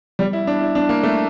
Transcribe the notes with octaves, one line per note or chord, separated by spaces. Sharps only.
G3
E4
D4
E4
D4
A#3
A3